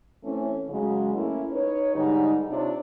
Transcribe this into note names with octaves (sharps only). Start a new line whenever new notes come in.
E3 A3 C4 C#4
C#3 F#3 G#3
A3 A#3 C#4 E4
D#4 B4 C#5
G#2 D3 G3 D#4
C3 D4 D#4 F4 C#5